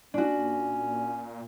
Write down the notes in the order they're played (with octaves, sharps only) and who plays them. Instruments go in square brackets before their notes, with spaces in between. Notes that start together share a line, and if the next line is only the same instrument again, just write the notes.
[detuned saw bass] A#2 [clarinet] C#4 [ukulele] D4 F#4